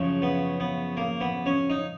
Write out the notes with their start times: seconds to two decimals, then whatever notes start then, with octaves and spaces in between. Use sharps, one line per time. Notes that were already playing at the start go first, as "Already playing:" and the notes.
Already playing: F#2 C#3 F3
0.22 B3
0.60 B3
0.97 A#3
1.21 B3
1.46 C#4
1.70 D#4